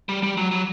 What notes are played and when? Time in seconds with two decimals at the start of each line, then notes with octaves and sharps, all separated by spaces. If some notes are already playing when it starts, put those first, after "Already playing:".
0.09 G3
0.23 G3
0.37 F#3
0.51 F#3